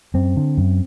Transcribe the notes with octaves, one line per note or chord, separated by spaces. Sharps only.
F#2 C4
D3
F#2